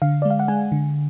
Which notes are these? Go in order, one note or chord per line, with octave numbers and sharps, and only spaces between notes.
D3 F5
G#3 D5
F5
F#5
G#3 G#5
D3